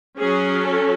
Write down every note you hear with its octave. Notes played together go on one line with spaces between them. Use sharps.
F#3 C#4 G#4
A4